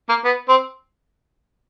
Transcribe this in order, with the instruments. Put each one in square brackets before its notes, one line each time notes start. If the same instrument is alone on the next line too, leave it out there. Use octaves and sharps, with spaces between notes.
[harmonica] A#3
B3
C4